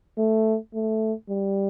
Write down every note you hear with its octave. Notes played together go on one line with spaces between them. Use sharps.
A3
A3
G3